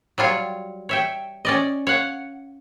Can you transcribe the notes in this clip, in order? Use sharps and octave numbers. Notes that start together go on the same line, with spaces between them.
F#3 G3 F4 C#5
C#5 E5 G5
C#4 D5 D#5
C#5 F5 F#5